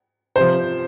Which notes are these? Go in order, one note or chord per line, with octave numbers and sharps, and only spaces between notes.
C3 F3 C5